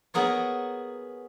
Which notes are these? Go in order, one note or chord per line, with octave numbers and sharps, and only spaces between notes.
B3 F#4 G#4 A#4 C#5